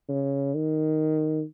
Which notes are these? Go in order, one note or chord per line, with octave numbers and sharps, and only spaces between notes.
C#3
D#3